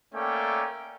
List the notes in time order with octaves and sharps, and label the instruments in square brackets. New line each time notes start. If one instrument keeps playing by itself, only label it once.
[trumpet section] A3 A#3 C#4 D5 G5